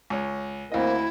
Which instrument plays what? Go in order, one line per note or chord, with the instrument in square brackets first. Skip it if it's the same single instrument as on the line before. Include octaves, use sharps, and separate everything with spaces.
[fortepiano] C#2 C#5
[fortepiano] D2 D#5 [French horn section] A#3 C4 [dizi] E4